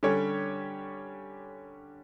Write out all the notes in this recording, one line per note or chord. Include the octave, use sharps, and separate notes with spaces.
D3 G3 C#4 G4 C#5